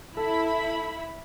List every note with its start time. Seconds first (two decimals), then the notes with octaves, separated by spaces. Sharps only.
0.17 E4 A4 E5 B5